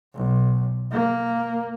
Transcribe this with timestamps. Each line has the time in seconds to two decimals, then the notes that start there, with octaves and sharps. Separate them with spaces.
0.15 B1
0.92 A#3